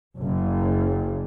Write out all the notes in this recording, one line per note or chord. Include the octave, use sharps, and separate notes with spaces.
F#1